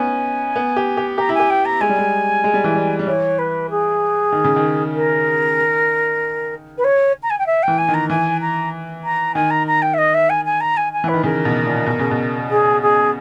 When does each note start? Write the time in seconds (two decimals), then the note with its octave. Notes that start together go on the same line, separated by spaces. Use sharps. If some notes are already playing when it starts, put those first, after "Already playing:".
Already playing: B3 C#4 D#4 G#5
0.56 B3
0.76 G4
0.97 G4
1.18 G4 A#5
1.29 E4
1.34 G#5
1.40 G4
1.50 G5
1.65 A#5
1.81 G#3 G#5
1.89 G3
1.98 G#3
2.44 G#3
2.54 G3
2.64 E3
2.75 G3
2.99 G3
3.07 E3 C#5
3.38 B4
3.70 G#4
4.32 D#3
4.44 C#3
4.56 D#3
4.95 A#4
6.78 B4
6.84 C#5
7.22 A#5
7.30 G#5
7.39 G5
7.46 E5
7.63 G5
7.68 E3
7.78 G#5
7.88 D#3
7.94 A#5
8.09 E3 G#5
8.41 A#5
9.04 A#5
9.35 D#3 G#5
9.50 A#5
9.67 A#5
9.82 G5
9.93 E5
9.98 D#5
10.14 E5
10.29 G#5
10.45 G#5
10.60 A#5
10.77 G#5
10.93 G#5
11.04 E3 B4
11.14 D#3
11.24 C#3 A#4
11.45 B2
11.66 A#2
11.86 B2
11.99 C#3
12.11 B2
12.50 G#4
12.81 G#4